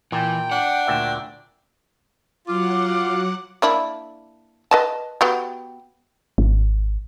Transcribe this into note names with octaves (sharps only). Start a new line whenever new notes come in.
A#2 E3 G5
D4 F#5
D2 A#2 E5
F#3 F4 F#5 D6
A#3 D4 E4
B4 D#5 A5
B3 F#4 G4
G#1